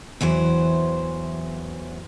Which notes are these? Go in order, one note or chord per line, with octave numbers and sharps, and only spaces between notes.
E2 E3 F#3 C5